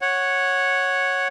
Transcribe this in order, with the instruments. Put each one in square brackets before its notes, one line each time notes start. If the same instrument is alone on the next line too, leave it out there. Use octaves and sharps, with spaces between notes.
[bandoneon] C#5 F#5